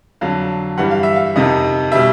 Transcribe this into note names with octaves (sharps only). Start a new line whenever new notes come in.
F2 D3 F#3 F5
G2 E3 G3 F#5
F5
E5
F5
F2 C3 D#3 D#5
B2 G3 E5